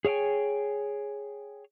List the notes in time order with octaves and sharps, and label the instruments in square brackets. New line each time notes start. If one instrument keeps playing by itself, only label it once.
[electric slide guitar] G#4 C#5 F5 G5 G#5